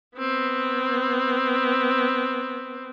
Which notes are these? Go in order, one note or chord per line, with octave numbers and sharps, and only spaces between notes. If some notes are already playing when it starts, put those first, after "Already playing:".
B3 C4